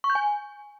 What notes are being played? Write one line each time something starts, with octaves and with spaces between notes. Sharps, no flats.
C#6
G6
G#5